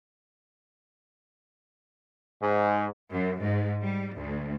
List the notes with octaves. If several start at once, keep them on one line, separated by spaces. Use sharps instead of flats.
G#2
F#2
G#2
G3
D2